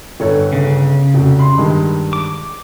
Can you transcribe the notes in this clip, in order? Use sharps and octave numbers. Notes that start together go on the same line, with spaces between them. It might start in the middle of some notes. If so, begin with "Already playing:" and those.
G1 A4 C#5
C#3
F1 F#4
B5 C6
G2 D#3 G#3
D6